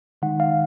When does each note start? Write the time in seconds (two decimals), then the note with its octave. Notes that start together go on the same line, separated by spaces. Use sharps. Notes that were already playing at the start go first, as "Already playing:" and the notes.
0.22 D#3 G#3 D#4 F#5
0.40 F5